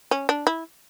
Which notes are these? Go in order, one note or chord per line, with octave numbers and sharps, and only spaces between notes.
C#4
D4
E4